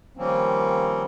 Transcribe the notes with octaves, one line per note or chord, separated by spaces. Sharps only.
D#3 F3 G3 A#3 C4 C#4